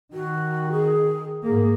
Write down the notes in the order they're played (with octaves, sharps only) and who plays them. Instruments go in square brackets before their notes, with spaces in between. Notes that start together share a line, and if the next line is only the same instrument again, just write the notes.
[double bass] D#3 [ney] F#4
[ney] G#4
[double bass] G#2 A#3 [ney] G#4